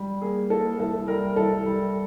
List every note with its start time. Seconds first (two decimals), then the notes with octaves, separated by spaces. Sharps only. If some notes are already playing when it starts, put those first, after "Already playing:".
Already playing: G3
0.22 A#3 G#4
0.50 A#3 A4
0.79 C2 A4
1.08 G3 A#4
1.36 C2 A4
1.65 G3